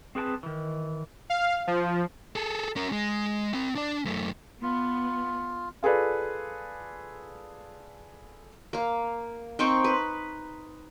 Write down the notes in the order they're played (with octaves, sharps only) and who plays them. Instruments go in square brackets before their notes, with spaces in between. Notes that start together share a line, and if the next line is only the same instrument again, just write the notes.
[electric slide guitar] C4 G#4 B4 G5 A5
D#3 E3
[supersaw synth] F5
F3
[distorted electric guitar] G#4 A4
C#4 A#4
G#3
C4 B5
D4 D5
F#2 A3
[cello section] B3 [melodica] F4
[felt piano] F4 G#4 A4 B4 D5
[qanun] A#3 F5
C4 D#4 C5 C#6
B4